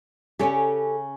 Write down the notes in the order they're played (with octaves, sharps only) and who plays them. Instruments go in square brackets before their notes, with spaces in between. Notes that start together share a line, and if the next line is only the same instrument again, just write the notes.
[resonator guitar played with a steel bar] C#3 C#4 [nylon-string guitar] G4 A4 C#5